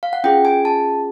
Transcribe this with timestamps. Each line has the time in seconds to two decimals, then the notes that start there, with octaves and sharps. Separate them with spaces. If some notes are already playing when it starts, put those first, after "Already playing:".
0.03 F5
0.13 F#5
0.24 C#4 F4 G#4 G5
0.45 G#5
0.65 A5